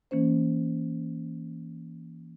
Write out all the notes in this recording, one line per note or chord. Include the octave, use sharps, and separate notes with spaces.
E3 A#3 C#4 C5